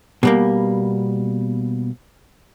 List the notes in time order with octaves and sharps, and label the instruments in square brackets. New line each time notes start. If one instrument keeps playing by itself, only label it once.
[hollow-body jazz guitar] B2 G3 A#3